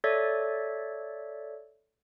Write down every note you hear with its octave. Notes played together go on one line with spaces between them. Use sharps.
A4 C#5 D5 E5